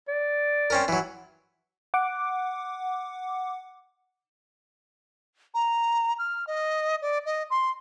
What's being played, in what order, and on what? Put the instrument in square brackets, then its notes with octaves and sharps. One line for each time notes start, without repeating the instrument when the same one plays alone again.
[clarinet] D5
[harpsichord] C4 C#4 A#4
E3 F#3
[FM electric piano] F#5 D6
[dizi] A#5
F6
D#5
D5
D#5
C6